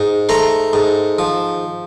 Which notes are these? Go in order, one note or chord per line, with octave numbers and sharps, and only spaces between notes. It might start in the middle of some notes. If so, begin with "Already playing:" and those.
Already playing: G#2
A3 A#5 C6
G#2
F3